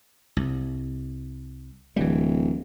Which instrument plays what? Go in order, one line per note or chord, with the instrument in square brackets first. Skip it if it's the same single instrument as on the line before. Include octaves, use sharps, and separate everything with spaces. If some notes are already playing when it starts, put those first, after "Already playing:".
[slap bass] C2
[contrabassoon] D1 [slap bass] E3 G3